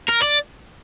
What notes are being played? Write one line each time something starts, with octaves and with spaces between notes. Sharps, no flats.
A#4
D5